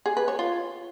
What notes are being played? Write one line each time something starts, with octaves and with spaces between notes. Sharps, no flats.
G#4
B4
C#5
F4